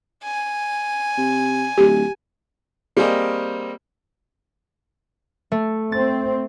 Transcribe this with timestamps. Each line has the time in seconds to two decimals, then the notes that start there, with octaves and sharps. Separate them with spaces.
0.24 G#5
1.18 C3
1.78 D1 G4
2.97 G3 A#3 C4 G#4 A#4 D#5
5.52 A3
5.92 C4 A6